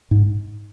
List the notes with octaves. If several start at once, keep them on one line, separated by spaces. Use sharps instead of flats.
G#2